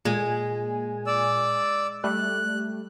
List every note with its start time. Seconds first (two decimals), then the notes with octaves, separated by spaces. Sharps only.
0.05 A#2 G#3 G#5
1.07 D5 E6
2.04 G3 A3 F#6